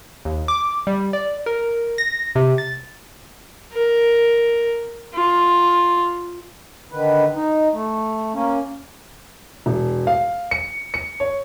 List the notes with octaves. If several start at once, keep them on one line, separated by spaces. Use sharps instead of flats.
D#2
D6
G3
D5
A#4
A#6
C3
A6
A#4
F4
D3 D#3 B4
D#4
A3
A#3 C#4
E1
F5
C#7
C#7
C#5